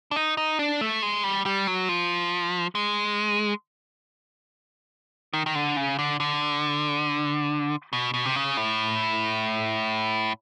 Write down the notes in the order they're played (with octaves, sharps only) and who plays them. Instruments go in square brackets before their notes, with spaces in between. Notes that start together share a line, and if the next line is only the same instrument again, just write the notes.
[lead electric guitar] D4
D#4
D#4
D4
A3
G#3
G3
G3
F#3
F3
G#3
D#3
D#3
D3
C#3
D3
D3
B2
B2
C3
C#3
A2